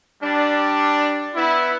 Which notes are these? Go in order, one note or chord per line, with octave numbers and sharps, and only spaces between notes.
G3 D4
B3 E4